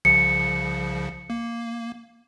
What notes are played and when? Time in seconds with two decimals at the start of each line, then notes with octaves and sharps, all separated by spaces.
0.05 C2 C#3 F3 C#7
1.30 A#3